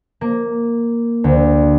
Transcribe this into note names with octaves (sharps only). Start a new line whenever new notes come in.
A#3
D2